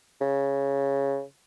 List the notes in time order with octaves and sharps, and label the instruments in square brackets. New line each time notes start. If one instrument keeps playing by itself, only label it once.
[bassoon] C#3